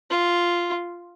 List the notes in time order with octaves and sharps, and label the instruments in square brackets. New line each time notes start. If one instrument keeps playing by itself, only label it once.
[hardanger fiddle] F4